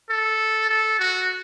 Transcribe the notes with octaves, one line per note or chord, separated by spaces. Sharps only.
A4
A4
F#4